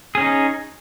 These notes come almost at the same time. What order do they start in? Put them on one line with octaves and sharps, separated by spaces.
G#4 C#4 D#4